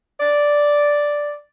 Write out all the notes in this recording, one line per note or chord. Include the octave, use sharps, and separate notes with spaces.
D5